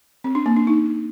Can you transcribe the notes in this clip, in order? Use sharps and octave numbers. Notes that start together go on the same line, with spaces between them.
C4
D4
A#3
D4
D#4